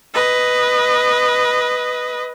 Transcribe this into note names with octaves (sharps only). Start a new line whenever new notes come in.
B4 D#5